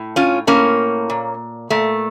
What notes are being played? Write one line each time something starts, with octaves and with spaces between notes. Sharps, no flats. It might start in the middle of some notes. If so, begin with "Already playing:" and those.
Already playing: A2
C#4 F4
A2 A#3 C#4
A#2
A#2 A3